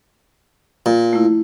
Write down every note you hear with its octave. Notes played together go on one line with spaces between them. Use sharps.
A#2
A3 E4